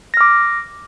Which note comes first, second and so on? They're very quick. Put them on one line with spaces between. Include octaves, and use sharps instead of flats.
A#6 F6 D6